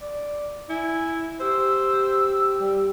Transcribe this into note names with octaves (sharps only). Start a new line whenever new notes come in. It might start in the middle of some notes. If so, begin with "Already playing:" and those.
D5
E4 G#5
G4 C5 E6
G3